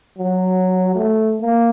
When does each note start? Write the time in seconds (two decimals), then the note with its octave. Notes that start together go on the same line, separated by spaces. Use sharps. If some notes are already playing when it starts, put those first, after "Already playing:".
0.18 F#3
0.95 A3
1.41 A#3